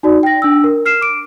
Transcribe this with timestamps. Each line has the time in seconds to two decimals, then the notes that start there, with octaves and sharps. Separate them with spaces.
0.03 D#4 F#4 D5
0.23 G5 A#6
0.42 D4 E6
0.64 A#4
0.86 F6 C7 E7
1.01 D6 D7